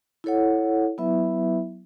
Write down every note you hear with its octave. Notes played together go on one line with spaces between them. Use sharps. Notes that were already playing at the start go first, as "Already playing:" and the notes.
E4 A4 C#5 F#5
F#3 B3 E4 B4 E5